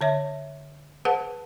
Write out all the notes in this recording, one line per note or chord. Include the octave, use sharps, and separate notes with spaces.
D3 C#5 E5
G#4 B4 C5 F#5 A5